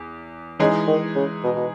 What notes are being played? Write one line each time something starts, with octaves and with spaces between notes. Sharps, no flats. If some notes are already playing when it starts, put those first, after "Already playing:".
Already playing: E2
C#3 E3 G#3 D#4 G#4
D#3
C#3
B2
B2